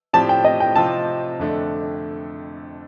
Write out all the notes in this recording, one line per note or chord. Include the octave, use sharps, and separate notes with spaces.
A2 F3 C4 G4 D5 A5
G5
D#5
G5
C3 F3 C4 F4 A5
F2 D3 A3 D4